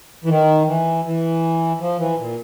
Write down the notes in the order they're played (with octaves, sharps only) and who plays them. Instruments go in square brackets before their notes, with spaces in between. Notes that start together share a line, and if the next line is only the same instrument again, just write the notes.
[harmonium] E3
D#3
E3
E3
F3
E3
A#2